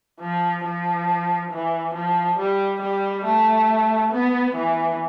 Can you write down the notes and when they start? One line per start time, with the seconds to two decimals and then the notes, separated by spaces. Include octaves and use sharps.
0.20 F3
0.64 F3
1.51 E3
1.95 F3
2.38 G3
2.82 G3
3.25 A3
4.12 B3
4.56 E3